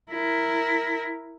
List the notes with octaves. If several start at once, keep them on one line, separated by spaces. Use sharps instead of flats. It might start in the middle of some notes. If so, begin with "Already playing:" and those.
E4 A#4